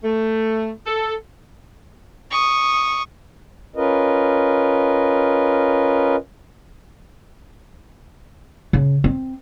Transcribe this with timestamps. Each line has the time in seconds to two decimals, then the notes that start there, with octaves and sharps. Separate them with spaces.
0.03 A3
0.86 A4
2.31 C#6 D#6
3.76 C#4 F4 A#4 B4 D#5
8.73 C#3
9.04 C4